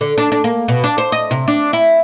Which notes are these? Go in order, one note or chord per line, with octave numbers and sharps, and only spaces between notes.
D3
D4
D4
A#3
B2
D4
C5
D#5
C3
D4
E4